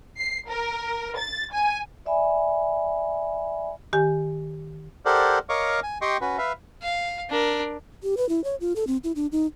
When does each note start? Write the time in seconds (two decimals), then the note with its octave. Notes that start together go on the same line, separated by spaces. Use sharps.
0.17 C7
0.48 A#4
1.18 A6
1.52 G#5
2.06 D5 E5 G#5 B5
3.93 D#3 G4 G#5
5.05 G4 A4 A#4 C5 D5 F#5
5.49 A#4 C#5 D#5 F5 C#6 D6
5.83 G#5
6.01 G4 D#5 G5 C6 C#6
6.21 C#4 F#4 B4
6.38 B4 E5 F5
6.82 F5
7.30 D4 A#4
8.03 G4
8.17 B4
8.29 E4
8.44 C#5
8.61 F4
8.76 A4
8.87 C4
9.04 E4
9.16 D4
9.32 D#4